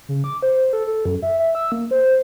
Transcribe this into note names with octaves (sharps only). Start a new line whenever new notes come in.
C#3
D6
C5
A4
A4
F#2
E5
E5
E6
A#3
C5